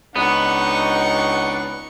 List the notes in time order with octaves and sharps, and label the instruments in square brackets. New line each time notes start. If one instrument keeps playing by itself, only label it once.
[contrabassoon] C#2 [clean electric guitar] B3 [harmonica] D4 F#5 [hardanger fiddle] D#4 C#6